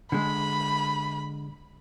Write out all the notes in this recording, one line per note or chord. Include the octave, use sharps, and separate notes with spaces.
D3 G#3 B5